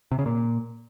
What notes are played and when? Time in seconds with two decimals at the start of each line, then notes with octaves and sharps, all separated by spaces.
0.12 C3
0.19 C#3
0.26 A#2